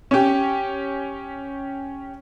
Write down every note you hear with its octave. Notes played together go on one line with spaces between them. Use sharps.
C#4 G4